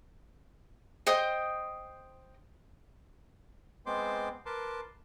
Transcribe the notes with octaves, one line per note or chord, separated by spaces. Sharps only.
C5 D#5 G5 D#6
G#3 B3 C4 C5 C6 D6
A#4 B4 A5 C6 D6